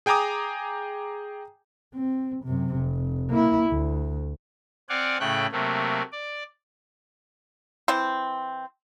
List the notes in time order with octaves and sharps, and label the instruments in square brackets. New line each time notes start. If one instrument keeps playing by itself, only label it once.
[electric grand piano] G#4 G5 G#5 A#5 D6 D#6
[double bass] C4
F#2 C3
F1
A#3 E4
D2
[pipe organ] C4 D5 F5 F#5 G#5
A2 C#3 A3 G5 F#6
C3 F#3 A3 A#3
D5
[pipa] E3 C4